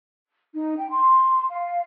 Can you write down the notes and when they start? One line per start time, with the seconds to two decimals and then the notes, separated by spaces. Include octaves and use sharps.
0.53 D#4
0.77 G5
0.89 C6
1.51 F5